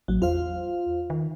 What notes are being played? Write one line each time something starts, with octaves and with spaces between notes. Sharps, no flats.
A1 F#3
E2 F4 C5 F5
D#3